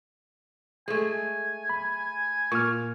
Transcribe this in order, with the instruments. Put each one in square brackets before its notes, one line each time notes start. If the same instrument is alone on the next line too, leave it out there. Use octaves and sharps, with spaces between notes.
[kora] G#3 A3 [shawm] G#5
[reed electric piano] B5
[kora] A#2 [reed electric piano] C#6 F6